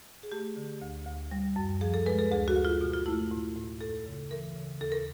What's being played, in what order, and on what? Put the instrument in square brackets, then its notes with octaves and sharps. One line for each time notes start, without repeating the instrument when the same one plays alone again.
[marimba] G#4
A3 G4
D3
D2
D2
G3
F#2
F3 G#4
A4
G#3 B4
A4
D2 G#4
F#4
D2
F4
B2
F4
A3 E4
A2
A2
F2 A4
C#3
E3 A#4
C#3
D#2 A4
A#4